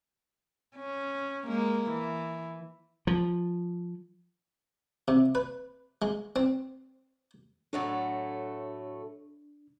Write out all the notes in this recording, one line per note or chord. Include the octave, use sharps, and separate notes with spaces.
C#4
G#3 A#3
E3
F3
C3
B4
G#3
C4
A2 F#3 A3 D4